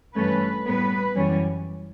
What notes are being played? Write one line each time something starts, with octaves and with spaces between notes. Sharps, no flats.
G2 E3 A3 C#4 B4
A2 G3 B3 B4
F#2 E3 G3 C#4